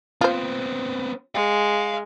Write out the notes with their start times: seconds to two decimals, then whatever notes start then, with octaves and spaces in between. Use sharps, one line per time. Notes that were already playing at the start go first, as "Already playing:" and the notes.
0.21 B3 C4 F4 C5
1.35 G#3 F5